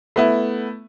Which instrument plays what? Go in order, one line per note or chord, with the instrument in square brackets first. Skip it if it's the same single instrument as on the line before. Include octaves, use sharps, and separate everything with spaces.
[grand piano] A3 B3 E4